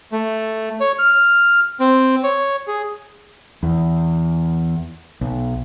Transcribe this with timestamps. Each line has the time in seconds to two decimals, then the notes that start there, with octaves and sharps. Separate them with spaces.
0.12 A3
0.80 C#5
0.99 F6
1.80 C4
2.24 C#5
2.67 G#4
3.63 E2
5.21 B1